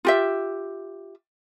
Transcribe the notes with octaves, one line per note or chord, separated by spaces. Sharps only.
F4 G4 E5